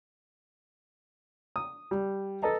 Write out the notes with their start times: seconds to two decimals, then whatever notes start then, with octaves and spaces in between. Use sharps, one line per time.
1.56 D#6
1.91 G3
2.42 A4 B4 D#5 A5 A#5